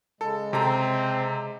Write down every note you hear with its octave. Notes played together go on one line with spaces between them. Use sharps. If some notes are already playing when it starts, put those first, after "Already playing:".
C#3 G#3 A4
C3 C4 A4 A#5